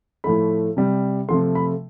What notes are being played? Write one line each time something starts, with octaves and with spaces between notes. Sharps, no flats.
A2 F3 A3 B5
C3 G3
C3 F3 A3 C6
B5